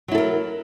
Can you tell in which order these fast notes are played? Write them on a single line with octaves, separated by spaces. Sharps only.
F#3 E4 A4 A#4